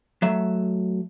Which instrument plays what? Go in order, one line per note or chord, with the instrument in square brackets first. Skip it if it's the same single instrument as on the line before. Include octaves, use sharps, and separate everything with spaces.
[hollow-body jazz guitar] F#3 A3 E5